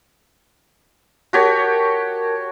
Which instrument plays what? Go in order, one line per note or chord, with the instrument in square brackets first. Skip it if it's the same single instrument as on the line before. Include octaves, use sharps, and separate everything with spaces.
[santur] F#4 G4 C#5 [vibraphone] A#4 A5